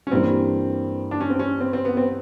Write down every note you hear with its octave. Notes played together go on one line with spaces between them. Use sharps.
C#4
G2 E3 G3 A#3 C4
D4
C#4
C4
C#4
C4
C4
B3
C4